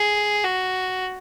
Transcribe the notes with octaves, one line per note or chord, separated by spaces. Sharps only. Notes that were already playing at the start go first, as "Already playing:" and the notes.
Already playing: G#4
F#4